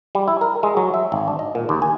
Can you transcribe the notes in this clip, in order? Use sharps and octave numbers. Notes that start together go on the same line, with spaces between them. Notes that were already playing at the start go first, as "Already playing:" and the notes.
G3
E4
A#4
G#3
F#3
E5
G#1
D4
D#5
A#2
D#2
G#5